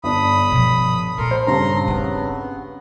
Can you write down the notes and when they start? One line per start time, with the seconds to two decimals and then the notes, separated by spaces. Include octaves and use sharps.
0.04 G1 D4 B5 D#6
0.52 B2 F3
1.18 A#2 A4 A#4 C6
1.31 C5
1.47 G2 C#3 A#5 C6
1.88 B3 C4 D#4